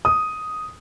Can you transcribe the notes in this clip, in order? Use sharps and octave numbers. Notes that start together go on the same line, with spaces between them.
D#6